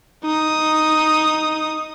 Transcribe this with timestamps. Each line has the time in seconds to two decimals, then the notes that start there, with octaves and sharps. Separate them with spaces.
0.25 D#4 D#6